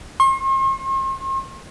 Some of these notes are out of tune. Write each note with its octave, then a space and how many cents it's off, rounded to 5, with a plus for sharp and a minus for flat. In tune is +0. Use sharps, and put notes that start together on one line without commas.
C6 +45